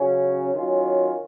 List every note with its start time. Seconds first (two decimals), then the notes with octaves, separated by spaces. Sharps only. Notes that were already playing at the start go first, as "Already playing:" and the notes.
Already playing: C#3 F#3 C#4
0.52 D#3 F#3 C#4 F4